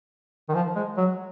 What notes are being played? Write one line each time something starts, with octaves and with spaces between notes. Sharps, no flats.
D#3
F3
G#3
F#3